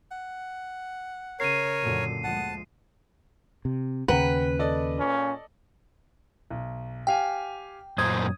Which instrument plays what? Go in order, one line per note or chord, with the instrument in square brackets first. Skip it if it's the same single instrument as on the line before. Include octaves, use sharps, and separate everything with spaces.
[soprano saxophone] F#5
[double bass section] C#3 [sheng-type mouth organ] A#4 C#5 [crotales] C7 D#7
[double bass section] F#2 A#2 D3
[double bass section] D2 F3 G#3 [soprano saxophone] F#5 [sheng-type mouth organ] A5
[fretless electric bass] C3
[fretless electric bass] D#2 C#3 [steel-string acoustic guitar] B4 [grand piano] F#5 G5 A#5
[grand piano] A4 D5 D#5
[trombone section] A#2 C#4
[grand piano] B1
[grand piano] G4 F5 G#5 [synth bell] G5
[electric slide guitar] F#2 A#2 C5 [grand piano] D#6 [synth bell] G#6